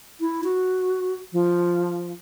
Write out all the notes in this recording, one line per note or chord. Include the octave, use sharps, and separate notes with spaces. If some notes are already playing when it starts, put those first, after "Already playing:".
E4
F#4
F3